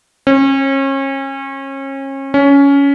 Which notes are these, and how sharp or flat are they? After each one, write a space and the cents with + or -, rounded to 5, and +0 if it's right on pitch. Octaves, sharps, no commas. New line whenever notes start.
C#4 -35
C#4 +15